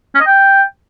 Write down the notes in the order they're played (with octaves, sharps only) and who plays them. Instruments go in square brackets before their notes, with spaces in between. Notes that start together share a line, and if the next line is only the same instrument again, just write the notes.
[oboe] C#4
D#5
G5